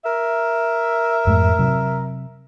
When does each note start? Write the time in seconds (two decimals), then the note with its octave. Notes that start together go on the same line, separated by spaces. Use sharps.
0.04 A#4 E5
1.27 F2 G#2 A3
1.59 C3 F#3